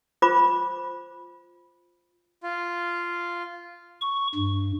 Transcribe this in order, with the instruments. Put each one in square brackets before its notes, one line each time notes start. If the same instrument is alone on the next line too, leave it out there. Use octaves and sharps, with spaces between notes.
[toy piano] F4 C5 B5 D6
[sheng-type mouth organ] F4
[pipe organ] C#6
G2